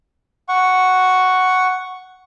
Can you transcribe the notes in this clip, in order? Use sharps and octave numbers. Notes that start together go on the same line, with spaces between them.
F#5 C#6